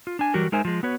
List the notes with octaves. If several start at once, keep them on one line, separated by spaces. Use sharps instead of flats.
F4
D4 G#5
E3 F#3 G3 F#4 G4 A#4
G#3 D#4 A#4 C5 E5 G#5
F3 G#3
B3 F#4 B4 C#5